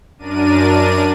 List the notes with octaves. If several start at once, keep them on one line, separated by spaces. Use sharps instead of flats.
F#2 D4 A#4 D5 D#7